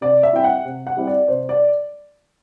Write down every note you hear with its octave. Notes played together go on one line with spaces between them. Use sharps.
C3 D5
E5
G3 C4 E4 G5
F#5
C3
F#5
G3 C4 E4
D5
C3 C5
D5